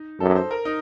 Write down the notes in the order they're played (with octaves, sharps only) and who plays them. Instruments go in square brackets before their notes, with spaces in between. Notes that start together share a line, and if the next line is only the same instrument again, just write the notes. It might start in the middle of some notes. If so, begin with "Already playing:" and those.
Already playing: [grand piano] D#4
[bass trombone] F#2 [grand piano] A4
[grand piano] C5
A#4
D#4